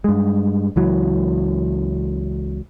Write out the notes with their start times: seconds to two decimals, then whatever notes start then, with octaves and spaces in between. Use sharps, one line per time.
0.04 G2 G#3
0.76 C#2 E3 F#3